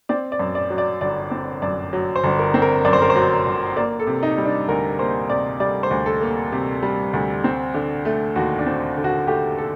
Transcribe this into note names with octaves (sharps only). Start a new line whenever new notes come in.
C4 D5
D5
F#2
D5
F#3
D5
G1 D5
C4
F#2 D5
F#3
C5
G1
A#4
C4
A#4
F#2 D5
C5
A#4
C5
F#3
G1
A#3 D5
A4
C3
D#4
G3
D4
D2 A#4
A#3 C5
C3 D5
G3 D5
C5
D2
A4
A#3
C3
G3
D2
C4
D3
A3
D#2 F#4
D4
C4
D3
F#4
A3 G4
A4